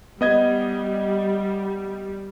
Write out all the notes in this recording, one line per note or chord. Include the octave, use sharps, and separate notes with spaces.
G3 B3 D#5 G#6